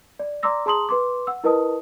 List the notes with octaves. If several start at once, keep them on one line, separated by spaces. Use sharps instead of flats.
D5
D5 A#5 C6 D6 E6 A#6
G#4 A5 A#5 C6 D#6 F#7
B4 C6 D6
F#5 E6
E4 A#4 B4 D#5 A5 D#6